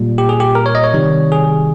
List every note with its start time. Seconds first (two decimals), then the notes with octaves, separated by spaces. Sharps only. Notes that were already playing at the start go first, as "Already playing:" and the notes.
Already playing: A#2 G3
0.18 G4
0.29 G#4
0.40 G4
0.55 A#4
0.66 C#5
0.75 D#5
0.84 C#5
0.94 C3 D#3 G3
1.32 G#4